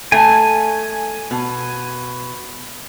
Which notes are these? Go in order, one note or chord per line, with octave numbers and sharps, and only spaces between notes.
A3 G#5
B2